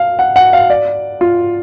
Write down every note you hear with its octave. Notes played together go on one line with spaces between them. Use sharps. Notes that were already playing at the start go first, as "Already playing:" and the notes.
Already playing: F5
F#5
F#5
F5
D5
F4